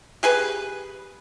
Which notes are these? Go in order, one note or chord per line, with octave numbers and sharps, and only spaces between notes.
G4 G#4 B4